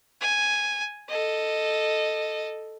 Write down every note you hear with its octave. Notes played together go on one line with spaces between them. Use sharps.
G#5
A4 D#5